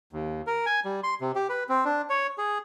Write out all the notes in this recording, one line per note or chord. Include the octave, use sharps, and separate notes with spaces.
D#2
A#4
G#5
G3
C6
C3
G4
B4
C4
D4
C#5
G#4